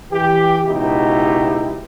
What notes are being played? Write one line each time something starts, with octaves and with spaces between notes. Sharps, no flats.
E3 G4
C#2 B2 D#4 E4 G4